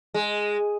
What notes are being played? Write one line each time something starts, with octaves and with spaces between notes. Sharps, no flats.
G#3